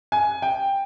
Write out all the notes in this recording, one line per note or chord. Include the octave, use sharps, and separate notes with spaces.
G#5
G5